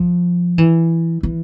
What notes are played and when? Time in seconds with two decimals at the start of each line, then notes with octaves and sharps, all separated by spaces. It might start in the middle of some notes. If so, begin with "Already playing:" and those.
Already playing: F3
0.58 E3
1.23 E3